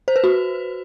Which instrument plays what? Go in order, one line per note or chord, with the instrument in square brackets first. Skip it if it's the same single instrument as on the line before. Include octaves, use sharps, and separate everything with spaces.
[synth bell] C5
B4
F#4